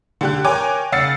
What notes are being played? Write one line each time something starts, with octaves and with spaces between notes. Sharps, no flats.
D3 G4 F#6
A#4 C#5 G5 G#5 D6
C#3 F#5 E6 A6 C7 C#7